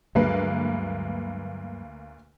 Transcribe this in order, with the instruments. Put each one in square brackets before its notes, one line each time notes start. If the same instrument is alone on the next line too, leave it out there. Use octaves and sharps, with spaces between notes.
[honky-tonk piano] D2 A#3 B4 [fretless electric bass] G2 F#3 G#3